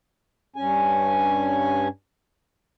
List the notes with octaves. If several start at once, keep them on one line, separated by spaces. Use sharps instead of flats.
G2 C#4 G#5